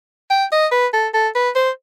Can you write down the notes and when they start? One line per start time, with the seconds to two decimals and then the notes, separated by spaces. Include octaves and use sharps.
0.30 G5
0.52 D#5
0.72 B4
0.93 A4
1.14 A4
1.35 B4
1.55 C5